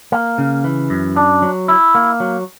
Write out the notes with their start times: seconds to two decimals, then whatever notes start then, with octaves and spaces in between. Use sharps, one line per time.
0.12 A#3
0.38 C#3
0.64 E3
0.90 F#2
1.16 D4
1.42 F#3
1.68 E4
1.95 A#3
2.20 F#3